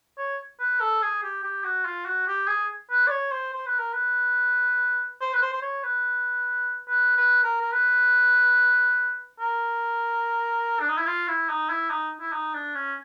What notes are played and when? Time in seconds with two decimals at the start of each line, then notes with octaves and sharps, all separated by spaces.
0.18 C#5
0.60 B4
0.80 A4
1.02 G#4
1.23 G4
1.43 G4
1.64 F#4
1.85 F4
2.06 F#4
2.27 G4
2.48 G#4
2.91 B4
3.07 D5
3.11 C#5
3.32 C5
3.53 C5
3.66 B4
3.79 A#4
3.93 B4
5.21 C5
5.33 B4
5.42 C5
5.53 C5
5.62 C#5
5.84 B4
6.88 B4
7.17 B4
7.43 A#4
7.61 A#4
7.72 B4
9.40 A#4
10.80 D4
10.89 D#4
10.98 E4
11.07 F4
11.28 E4
11.50 D#4
11.70 E4
11.90 D#4
12.21 E4
12.33 D#4
12.54 D4
12.75 C#4